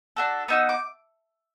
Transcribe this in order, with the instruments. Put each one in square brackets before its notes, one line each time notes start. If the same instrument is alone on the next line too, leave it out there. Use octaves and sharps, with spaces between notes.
[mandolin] D4 F#4 A4
B3 D#4 F#4 E6
D6